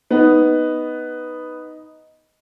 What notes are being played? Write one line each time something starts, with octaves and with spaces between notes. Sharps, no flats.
B3 D#4